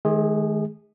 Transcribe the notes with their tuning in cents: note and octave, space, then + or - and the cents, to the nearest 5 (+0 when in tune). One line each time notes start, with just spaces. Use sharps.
D#3 +0 G#3 +40 G#4 -25